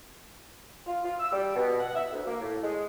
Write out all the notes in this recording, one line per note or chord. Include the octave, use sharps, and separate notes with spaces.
F4
F4
E6
G3
B2
F#5
E5
D2
A#3
A2
G#3